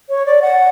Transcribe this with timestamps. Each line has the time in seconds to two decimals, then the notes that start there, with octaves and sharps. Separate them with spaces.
0.09 C#5
0.26 D5
0.42 F#5